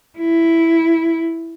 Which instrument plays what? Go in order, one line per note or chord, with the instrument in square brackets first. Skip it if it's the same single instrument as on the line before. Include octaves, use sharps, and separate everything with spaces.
[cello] E4